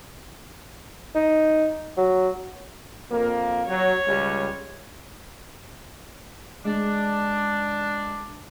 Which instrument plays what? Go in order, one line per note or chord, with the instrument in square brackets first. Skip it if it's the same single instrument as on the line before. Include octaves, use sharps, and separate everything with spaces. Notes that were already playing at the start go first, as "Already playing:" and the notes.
[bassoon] D#4
F#3
[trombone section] F2 A#3
[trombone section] F#3 [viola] C#5
[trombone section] C#2 G3
[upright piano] G#3 [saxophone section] D4